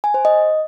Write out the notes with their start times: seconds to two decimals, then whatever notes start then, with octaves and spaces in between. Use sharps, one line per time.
0.04 G#5
0.14 C5
0.25 D#5